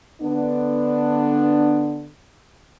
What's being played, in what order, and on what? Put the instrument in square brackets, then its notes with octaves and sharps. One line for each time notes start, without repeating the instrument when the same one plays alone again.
[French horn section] D3 B3 D4